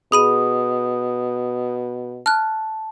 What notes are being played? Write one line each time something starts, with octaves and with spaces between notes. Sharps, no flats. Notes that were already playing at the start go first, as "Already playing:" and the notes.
B2 G#4 B5 D#6 D#7
A5 F6 F#6